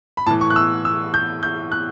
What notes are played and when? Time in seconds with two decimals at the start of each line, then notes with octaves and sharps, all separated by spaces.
0.17 B5
0.26 A2 E3 A5
0.41 C#6
0.50 F#6
0.56 E6
0.85 E6
1.14 G6
1.43 G6
1.72 F#6